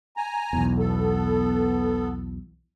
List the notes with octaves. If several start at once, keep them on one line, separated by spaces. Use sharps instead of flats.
G#5 A#5
B1 E2
B3 A4